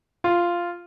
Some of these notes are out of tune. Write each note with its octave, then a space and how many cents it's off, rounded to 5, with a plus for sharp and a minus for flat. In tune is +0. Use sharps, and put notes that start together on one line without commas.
F4 -5